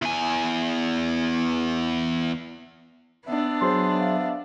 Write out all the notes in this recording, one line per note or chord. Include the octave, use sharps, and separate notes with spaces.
E2 G#5
B3 D4 E5
F#3 G#4 C5 C6
F5